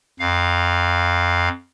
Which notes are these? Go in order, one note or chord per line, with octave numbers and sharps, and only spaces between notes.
F2 F5